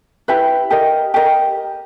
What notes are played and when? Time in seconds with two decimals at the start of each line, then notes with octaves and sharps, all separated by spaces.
0.28 E4 G4 B4 E5
0.70 G4 A#4 D#5
1.14 G4 A#4 D#5